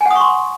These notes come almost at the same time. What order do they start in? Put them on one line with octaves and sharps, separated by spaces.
G#5 F#5 D#6 C#6 C6